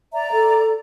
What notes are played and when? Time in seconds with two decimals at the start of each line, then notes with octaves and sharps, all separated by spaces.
0.13 D5 E5 A#5
0.32 A4